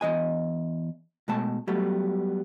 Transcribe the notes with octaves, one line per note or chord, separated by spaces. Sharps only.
E2 F3 D#5 G#5
B2 G#3 A3 A5
F#3 G3 A3 B3